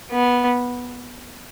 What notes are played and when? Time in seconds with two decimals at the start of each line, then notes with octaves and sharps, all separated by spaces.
0.11 B3